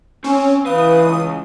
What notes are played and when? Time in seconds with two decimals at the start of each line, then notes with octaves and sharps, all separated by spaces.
0.24 C4 C#4
0.66 C#3 E3 B4 F5 D#6
1.00 C#2